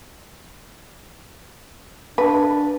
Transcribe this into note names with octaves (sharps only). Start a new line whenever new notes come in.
D4 B4